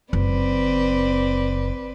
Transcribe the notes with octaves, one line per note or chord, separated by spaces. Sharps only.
F#1 C4 B4 D5